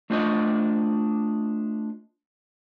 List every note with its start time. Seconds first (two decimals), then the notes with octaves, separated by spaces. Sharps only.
0.10 A3 D4 F4 C5 D5 D#5